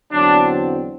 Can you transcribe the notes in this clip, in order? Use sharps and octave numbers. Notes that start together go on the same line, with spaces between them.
E2 D3 F#3 C4 D4